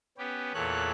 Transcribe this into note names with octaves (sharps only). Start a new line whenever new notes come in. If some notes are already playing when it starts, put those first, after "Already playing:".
B3 C#4 G4
E2 A#2 A4 C#5 F#6